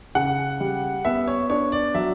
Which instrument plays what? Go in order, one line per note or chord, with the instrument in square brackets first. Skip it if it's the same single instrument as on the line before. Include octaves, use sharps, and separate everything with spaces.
[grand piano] C#3 [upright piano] F#5
[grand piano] G3
[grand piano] B3 [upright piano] E5
[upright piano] C#5
[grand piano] D4 [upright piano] C#5
[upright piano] D5
[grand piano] F#3 [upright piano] E5